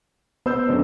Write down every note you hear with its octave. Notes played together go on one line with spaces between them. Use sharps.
B3 C5 E6 G6
F#2 D3 D#4